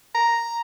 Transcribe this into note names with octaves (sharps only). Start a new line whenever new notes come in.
A#5